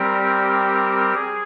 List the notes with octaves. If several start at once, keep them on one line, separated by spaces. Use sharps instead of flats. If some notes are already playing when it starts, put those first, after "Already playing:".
Already playing: G3 C4 G4 A#4
G#4